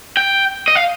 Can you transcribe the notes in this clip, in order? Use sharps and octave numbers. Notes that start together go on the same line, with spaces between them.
G5
D#5
F5